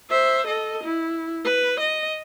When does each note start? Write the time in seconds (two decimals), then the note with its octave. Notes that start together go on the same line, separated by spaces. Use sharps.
0.10 C5 E5
0.47 A4 D#5
0.84 E4
1.45 B4
1.80 D#5